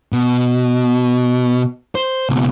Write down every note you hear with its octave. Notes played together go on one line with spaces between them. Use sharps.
B2
C5
C#2 B2